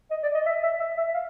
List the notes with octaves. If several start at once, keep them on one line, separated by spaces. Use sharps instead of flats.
D#5
D5
D#5
E5
E5
E5
E5
F5